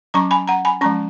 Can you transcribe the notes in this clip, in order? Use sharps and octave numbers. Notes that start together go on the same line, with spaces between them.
F#3 C#4 A#5 C#6
G#5 B5
F#5 A#5
G#5 B5
F3 G#3 C#4 A#5 C#6